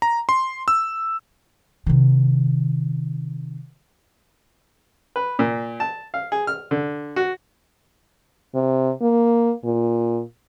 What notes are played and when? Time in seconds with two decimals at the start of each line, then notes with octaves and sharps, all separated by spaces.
0.02 A#5
0.29 C6
0.68 E6
1.86 C3 D#3
5.16 B4
5.39 A#2
5.80 A5
6.14 F5
6.32 G#4
6.47 F6
6.71 D3
7.16 F#4
8.55 C3
9.01 A#3
9.64 A#2